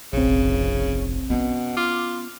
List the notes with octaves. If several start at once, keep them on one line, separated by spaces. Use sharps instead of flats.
F1 A#1 F2 C#3 C4
B2 B3 C#4
F4 D6